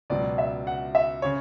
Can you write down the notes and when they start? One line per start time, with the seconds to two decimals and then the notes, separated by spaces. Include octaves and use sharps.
0.10 C#2 B2 F#3 D5
0.38 E5
0.67 F#5
0.95 E5
1.22 C#3 C#5